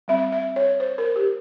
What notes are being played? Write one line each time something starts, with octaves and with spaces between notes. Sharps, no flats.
G3 C4 E5
E5
C#5
C5
A#4
G4